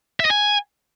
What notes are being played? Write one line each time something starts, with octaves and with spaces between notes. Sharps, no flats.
E5
D#5
G#5